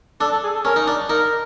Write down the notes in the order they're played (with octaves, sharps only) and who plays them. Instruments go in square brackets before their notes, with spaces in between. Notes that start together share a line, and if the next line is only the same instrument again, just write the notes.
[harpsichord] D4 [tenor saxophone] A4
[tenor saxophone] A4
G#4
A4
[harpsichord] C#4 [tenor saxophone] A#4
[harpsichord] D#4
D4
[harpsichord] D#4 [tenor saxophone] A#4